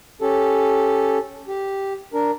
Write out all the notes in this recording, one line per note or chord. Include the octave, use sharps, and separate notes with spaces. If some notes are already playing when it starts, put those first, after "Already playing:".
C#4 G4 A4
G4
D4 A#4